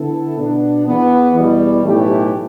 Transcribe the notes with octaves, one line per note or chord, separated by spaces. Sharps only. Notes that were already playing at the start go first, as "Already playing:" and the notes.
Already playing: D3 B3 E4 A4
B2 B3 D4
E2 E3 B3
E2 B2 G3
B1 A2 E3 A3 G4